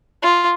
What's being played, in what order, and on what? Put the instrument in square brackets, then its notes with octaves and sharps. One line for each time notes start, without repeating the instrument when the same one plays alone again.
[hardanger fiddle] F4